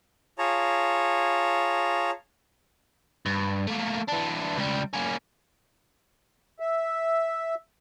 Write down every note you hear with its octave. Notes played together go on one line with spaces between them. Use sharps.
F4 G#4 C#5 A5 A#5
G2
A3 A#3
E3 D4
C#2 G3
A#3 C#4
E5